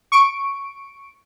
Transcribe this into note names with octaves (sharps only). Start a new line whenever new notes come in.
C#6 D7